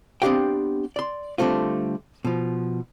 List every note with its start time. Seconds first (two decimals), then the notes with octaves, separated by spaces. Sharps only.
0.22 B3 C4 D4 G4 F5 G5
0.96 D5 C6
1.38 D3 G3 A3 C4 F4
2.25 B2 F3